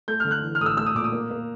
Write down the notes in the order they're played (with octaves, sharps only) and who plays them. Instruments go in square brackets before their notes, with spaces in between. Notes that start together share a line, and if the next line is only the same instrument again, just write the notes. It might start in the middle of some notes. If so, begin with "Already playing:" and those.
[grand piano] A3 G6
D3 F6
F#6
E3
F6
A2 D#6
E6
A3 E6
D#6
A#2 D6
D#6
A#3
A#3